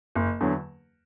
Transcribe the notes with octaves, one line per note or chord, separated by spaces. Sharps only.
F#1
E2 D3 F#3